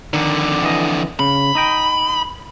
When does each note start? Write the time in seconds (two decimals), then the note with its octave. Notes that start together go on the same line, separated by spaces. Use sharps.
0.13 F2 D3 D#3
0.63 E3 D#5
1.19 C#3 B5
1.55 D#4 D#5 G5